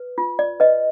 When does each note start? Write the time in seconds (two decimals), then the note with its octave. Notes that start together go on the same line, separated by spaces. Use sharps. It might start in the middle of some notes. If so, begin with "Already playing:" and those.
Already playing: B4
0.18 F4
0.39 D5
0.60 B4 D#5